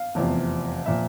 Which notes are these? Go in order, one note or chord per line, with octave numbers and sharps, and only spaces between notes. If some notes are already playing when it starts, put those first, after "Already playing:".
Already playing: F5
F1 E2 C3 F3
A#2 F3 E5